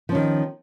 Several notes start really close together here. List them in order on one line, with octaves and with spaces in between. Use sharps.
F3 C#4 D#3